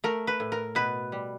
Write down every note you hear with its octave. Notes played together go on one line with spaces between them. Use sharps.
A3 A#4
B4
A2
A#4
B2 B4
G3